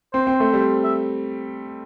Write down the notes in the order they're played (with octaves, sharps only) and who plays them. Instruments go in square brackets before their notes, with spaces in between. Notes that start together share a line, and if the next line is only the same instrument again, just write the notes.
[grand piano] C4 [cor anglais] C5
[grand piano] C4
A3
G3
[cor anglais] E5